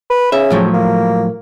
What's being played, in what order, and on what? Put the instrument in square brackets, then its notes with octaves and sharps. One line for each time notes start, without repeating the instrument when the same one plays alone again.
[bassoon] B4
[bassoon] C#3 [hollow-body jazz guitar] E5
[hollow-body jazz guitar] A2 F3 F#3
[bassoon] A#3